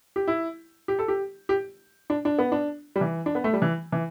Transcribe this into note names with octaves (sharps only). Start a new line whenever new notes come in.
G4
E4
G4
A4
G4
G4
D4
D4
B3
D4
G3
E3
D4
B3
A3
G3
E3
E3